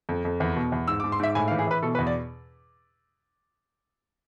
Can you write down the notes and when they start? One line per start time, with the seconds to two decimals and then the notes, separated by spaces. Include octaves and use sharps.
0.09 F2
0.25 F2
0.40 E2
0.56 B2
0.72 E2
0.88 G#2 E6
1.00 D6
1.04 G#2
1.12 C6
1.20 G#2 E5
1.35 A2 G#5
1.48 F5
1.51 E3
1.59 G#4
1.67 E3 B4
1.83 B2 A4
1.95 B4
1.99 E2
2.07 D5